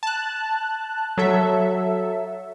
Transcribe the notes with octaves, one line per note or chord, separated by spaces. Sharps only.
A5 F#6
F#3 A4 E5